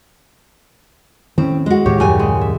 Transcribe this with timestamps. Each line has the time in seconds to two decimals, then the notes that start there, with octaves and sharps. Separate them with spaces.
1.38 A2 D#3 C4 C#4
1.66 G#3 F#4
1.86 D#2 A2 D#3 G4 C#5 E5
2.00 F#2 C#3 G3 G#5
2.19 G#3
2.41 E5